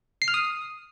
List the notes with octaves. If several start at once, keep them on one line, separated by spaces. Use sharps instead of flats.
C7
F6
D#6